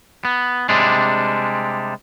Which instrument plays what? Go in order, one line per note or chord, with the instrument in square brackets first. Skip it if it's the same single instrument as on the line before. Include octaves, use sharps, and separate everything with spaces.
[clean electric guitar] B3
C3 G3 G#3 D4